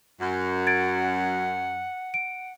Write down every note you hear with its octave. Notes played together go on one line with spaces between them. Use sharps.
F#2 F#5
G#6 A6 D7
D7